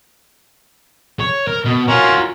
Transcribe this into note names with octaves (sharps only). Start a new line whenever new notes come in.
C#5
A#4
B2
C#4 F4 F#4 A#4 C6